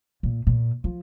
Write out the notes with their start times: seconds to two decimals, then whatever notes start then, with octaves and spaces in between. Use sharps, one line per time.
0.23 A#2
0.47 A#2
0.84 F3